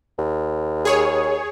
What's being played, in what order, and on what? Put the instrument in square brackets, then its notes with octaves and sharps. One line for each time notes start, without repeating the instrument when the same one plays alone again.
[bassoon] D#2
[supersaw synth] G#4 C#5